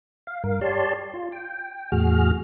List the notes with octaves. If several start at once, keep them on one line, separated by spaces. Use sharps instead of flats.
F5
G2 A#4 F5
G4 C#5 D5 A5 C6
F4
G5
E2 A2 F#4 G#4 F6